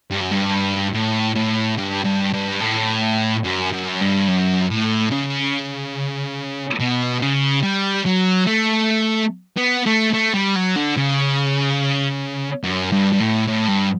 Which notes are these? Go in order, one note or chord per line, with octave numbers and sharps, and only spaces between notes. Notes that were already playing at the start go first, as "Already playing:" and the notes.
G2
F#2
G2
A2
A2
G2
G2
G2
A2
F#2
F#2
G2
F#2
A2
C#3
B2
C#3
G3
F#3
A3
B3
A3
A3
G3
F#3
D3
C#3
F#2
G2
G2
A2
A2
G2